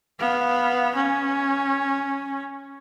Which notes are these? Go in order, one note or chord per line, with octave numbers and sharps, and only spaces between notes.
B3 F5
C#4